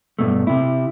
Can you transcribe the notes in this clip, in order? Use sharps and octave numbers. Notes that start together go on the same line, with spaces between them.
G2 B2 A3
C3 E4